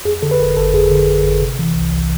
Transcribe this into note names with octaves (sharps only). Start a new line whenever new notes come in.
F2 G#4
D3 A4
B4
G1 A#4
G1 A4
F2 G#4
D3
G1
G1
C3
E3
C2
C2